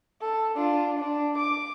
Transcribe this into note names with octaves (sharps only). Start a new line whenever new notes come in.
A4
D4 F4
D4
D6